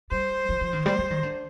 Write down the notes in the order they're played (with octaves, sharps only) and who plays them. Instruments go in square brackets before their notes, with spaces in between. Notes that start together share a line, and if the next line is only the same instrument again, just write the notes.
[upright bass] G3 [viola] C5
[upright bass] F3
F3
D#3
[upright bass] G3 [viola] C5
[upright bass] G3
D#3
D3